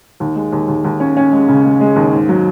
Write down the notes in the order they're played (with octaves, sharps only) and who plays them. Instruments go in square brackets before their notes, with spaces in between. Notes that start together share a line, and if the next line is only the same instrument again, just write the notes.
[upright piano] D#2
G#3
D#2
D#2
D#2
C#4
C#4
G#3
C#3
G#3
G#3
D#2
G#2
F#3